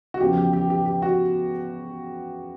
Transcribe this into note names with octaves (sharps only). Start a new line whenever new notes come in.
F#4
E2 C#3 F3 G4
G4
G4
G4
G4
F#4